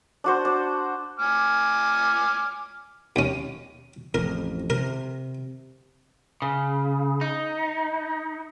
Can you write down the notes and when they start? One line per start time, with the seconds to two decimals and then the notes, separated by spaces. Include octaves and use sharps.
0.24 D4 F#4 C5
0.45 D4
1.19 G#5 D6 F6
3.16 D#2 C#4
4.14 A1 F2 A#4
4.70 C3 A#4
6.42 C#3
7.21 D#4